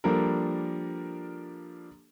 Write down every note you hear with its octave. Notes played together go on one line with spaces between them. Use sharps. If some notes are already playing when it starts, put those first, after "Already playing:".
F3 G3 A#3 D4 A4 A#4